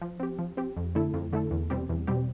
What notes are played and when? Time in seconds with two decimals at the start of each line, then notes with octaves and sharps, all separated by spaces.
0.02 F3
0.20 C4 G4
0.39 F3
0.57 C4 G4
0.77 F2
0.95 D3 A3 E4 A4
1.14 F2
1.33 D3 A3 E4 A4
1.51 E2
1.70 B2 G3 C4 G4
1.89 E2
2.07 B2 G3 C4 G4